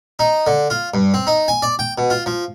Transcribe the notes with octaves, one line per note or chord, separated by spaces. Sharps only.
D#4
D3
F4
G2
C4
D#4
G#5
D5
G5
B2
F4
F3